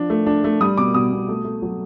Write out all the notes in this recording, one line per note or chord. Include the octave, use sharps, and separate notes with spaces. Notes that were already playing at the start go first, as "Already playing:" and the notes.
Already playing: F3 D4
A3
D4
A3
G3 D#6
B2 D6
B2 D#6
B2
A3
A3
F#3